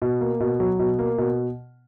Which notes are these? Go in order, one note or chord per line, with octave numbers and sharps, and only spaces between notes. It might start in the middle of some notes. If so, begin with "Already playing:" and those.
B2
A#3
B2
F#3
B2
A#3
B2